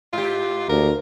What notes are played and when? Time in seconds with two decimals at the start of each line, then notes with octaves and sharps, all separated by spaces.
0.13 G#2 F4 G4
0.69 D2 A#4